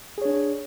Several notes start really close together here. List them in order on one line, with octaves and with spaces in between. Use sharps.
G#4 C#5 D4